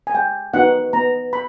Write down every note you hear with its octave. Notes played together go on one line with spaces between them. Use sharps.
G#5
G#3 G5
B3 D#4 F#4 F#5
B3 A#5
B5